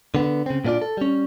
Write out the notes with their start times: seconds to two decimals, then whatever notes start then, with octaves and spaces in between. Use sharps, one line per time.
0.15 D3 B3
0.46 C#3 C4
0.65 A#2 A#3 D4 F4 D5
0.82 A4
0.97 G3 C#4